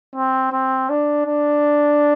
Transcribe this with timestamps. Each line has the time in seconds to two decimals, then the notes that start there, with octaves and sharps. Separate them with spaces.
0.16 C4
0.53 C4
0.90 D4
1.26 D4